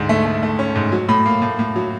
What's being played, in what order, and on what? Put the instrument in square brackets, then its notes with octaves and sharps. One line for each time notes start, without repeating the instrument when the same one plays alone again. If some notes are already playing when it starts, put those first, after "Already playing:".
Already playing: [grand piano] D2 G#2
A3
A3
A3
C#4
G#2
F#3
A2
A#3
A2
A2
F#3